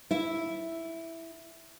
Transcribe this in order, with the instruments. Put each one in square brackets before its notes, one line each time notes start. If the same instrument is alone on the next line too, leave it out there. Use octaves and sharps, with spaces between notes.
[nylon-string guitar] E4 E5